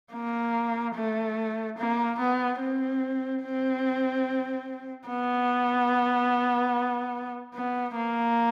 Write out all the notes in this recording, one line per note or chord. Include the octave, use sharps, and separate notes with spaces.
A#3
A3
A#3
B3
C4
C4
B3
B3
A#3